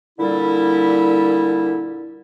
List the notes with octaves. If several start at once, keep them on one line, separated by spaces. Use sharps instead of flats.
A#2 D3 G3 E4